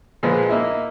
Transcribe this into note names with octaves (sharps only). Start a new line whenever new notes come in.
A#2 F3 G#3 B3
A#3 D#4 E4